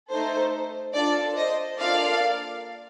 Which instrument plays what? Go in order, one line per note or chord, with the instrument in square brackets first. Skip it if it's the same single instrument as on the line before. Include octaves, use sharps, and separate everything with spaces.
[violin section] A3 D#4 A4 C5
D4 F4 A4 D5
C5 D#5
A#3 D4 F4 A4 D5 F5